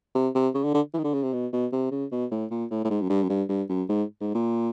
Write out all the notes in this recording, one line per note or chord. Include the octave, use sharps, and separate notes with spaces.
C3
C3
C#3
D3
D3
E3
D#3
D3
C#3
C3
B2
B2
C3
C#3
B2
A2
A#2
A2
A2
G#2
F#2
G2
F#2
G2
G2
F#2
G#2
G#2
A#2